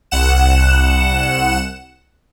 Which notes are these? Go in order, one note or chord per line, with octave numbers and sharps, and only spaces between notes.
C2 F#5 E7